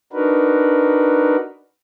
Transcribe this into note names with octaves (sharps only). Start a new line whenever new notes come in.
D4 D#4 F#4 A#4 B4